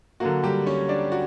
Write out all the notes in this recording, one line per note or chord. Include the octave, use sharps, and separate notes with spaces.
D3 F#3 A#3 F#4
G3 G4
C#4 C#5
D4 D5
F#4